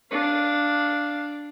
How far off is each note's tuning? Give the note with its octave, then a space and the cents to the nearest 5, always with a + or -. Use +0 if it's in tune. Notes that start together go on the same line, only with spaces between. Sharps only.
D4 +0 F5 +0